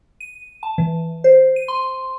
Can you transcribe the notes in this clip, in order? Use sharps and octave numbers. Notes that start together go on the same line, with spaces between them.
D#7
A5
E3
C5
D#7
C6